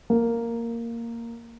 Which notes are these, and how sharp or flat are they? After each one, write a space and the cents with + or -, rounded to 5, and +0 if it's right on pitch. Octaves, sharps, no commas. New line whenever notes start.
A#3 -5